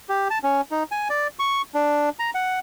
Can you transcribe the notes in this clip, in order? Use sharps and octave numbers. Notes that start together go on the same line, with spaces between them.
G4
A5
C#4
D#4
G#5
D5
C#6
D4
A#5
F#5